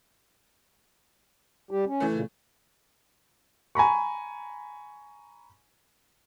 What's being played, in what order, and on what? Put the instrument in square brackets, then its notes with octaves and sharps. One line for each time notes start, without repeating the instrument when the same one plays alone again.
[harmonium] G3 G4
C#4
[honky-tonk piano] E3 A3
[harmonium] A#2 C#3
[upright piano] G#5 A#5 B5 C#6